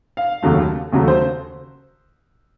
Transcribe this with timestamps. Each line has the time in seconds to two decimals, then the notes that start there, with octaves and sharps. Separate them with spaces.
0.17 F5
0.43 D#2 C#3 F#3 A3
0.92 D#2 C#3 F#3 A3
1.08 C5